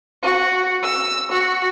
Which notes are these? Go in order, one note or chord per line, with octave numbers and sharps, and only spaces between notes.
F#4
E6
F#4